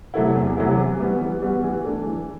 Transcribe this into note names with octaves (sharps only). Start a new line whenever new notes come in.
C3 F#3 A3 E4
E2
C3 F#3 A3 E4
E3
G3 B3 F#4
E3
G3 B3 F#4
E3
A3 D4
E3